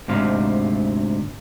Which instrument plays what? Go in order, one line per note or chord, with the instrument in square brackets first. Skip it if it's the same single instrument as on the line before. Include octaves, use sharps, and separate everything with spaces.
[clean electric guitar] D2 G#2 C3 F5